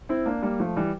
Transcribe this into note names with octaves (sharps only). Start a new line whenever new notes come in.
C4 E4
A#3 D4
G3 A#3
F3 A3
E3 G3